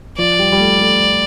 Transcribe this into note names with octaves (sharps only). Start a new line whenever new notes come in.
F3 D5
G3
G3
A3
A3